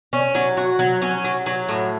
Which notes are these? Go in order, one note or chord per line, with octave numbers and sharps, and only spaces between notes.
C#4
F#3
F#4
F#3
C#4
F#3
F#3
A2